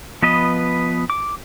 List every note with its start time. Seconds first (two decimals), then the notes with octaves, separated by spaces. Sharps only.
0.22 F3 B3 B4 D#5
1.10 D6